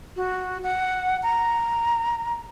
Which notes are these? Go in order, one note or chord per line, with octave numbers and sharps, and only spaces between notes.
F#4
F#5
A#5